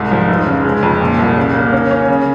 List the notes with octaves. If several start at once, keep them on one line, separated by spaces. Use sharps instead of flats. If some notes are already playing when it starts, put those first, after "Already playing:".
Already playing: C2 G#2
F3
F1
C#3
G#3
F2
A#2
C2
C#3
A#3
C#4
C#4
C#3